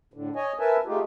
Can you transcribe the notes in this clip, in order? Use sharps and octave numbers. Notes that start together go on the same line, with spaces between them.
A2 D3
C#5 D#5 G#5
A#4 B4 E5 G#5 A5
G#3 A3 D#4 F4 G4